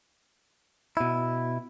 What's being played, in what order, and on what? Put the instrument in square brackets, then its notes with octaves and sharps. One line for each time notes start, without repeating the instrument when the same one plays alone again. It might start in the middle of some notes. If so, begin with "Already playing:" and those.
[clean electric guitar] B2 E4